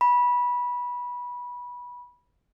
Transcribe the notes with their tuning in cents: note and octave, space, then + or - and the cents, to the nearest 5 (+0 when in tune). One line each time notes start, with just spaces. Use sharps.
B5 -15